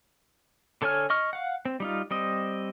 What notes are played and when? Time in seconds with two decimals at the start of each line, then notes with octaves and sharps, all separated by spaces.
0.82 D3 A4 C#5 G#5 F6
1.10 D#5 C#6 F6
1.33 F5 F#5
1.65 C4
1.80 G3 D#4 F4
2.11 G3 C4 D#5